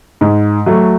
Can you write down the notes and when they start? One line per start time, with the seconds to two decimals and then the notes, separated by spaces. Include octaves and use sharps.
0.21 G#2
0.66 F#3 A3